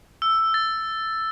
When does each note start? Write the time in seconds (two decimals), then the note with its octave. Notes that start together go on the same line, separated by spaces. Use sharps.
0.22 E6
0.54 A6